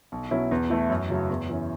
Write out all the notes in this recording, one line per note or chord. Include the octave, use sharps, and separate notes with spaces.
B1
B2 F#3 C#4 E4
E2
E3 A3 E4
F#2
C#3 F#3 A3
E2
E3 C#4